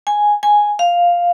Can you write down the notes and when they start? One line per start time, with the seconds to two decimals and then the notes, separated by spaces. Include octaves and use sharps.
0.07 G#5
0.43 G#5
0.79 F5